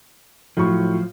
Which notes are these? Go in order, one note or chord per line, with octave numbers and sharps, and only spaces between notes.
A2 F3 F#3 C#6